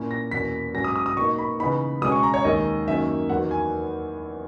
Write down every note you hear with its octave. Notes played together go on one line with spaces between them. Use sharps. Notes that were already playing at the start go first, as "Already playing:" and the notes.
Already playing: A#2 A#3 C#4 E4
A#6
E2 B2 A#3 C#4 E4 B6
G#2 F#3 C#4 A#6
D#6
D#6
D#6
B2 A#3 D#4 C#6
B5
C#3 E3 B3 D#4 B5
B2 G#3 C#4 D#6
C#6
A#5
C#5
D#2 D#3 G#3 D#5
F#2 D#3 A#3 C#4 E5
E2 D#3 F#3 F#5
G#5